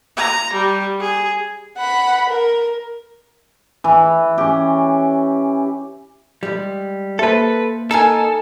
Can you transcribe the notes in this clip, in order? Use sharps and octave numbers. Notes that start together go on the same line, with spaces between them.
A#5
G3
G#4
F#5 B5
A#4
E3
C#4 G4
G3 G#3
A#3 A4 B4 C5 E5
D#4 A4 A#4 G#5